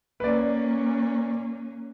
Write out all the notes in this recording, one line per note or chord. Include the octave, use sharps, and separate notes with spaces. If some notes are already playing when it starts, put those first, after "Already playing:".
A#3 C#4 B4 D5